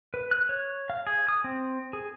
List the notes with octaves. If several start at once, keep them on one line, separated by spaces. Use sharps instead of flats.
B4
F#6
C#5
F5
G#4
D#6
C4
G#4